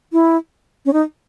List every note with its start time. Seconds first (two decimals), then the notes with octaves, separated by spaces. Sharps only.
0.13 E4
0.86 C#4
0.93 D#4